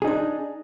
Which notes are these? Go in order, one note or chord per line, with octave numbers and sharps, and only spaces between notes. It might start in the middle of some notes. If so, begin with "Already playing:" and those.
D4 D#4 G#4